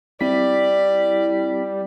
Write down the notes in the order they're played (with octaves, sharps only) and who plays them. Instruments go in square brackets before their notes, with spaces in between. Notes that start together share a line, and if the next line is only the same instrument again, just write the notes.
[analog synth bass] G3 [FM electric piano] C4 E4 B6 [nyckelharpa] D5